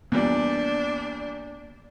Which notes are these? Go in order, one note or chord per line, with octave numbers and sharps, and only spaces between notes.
E2 A#2 G3 A#3 B3 D4